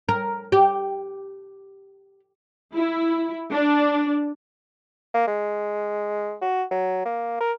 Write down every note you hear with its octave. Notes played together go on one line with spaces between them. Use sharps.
A#4
G4
E4
D4
A#3
G#3
F#4
F#3
A#3
A#4